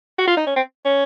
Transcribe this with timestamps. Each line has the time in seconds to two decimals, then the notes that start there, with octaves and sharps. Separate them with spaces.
0.19 F#4
0.28 F4
0.37 D#4
0.47 C#4
0.56 C4
0.85 C#4